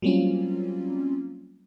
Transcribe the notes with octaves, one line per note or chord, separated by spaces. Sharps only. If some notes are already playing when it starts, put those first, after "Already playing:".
F#3 G3 A#3 C4 C#4 F4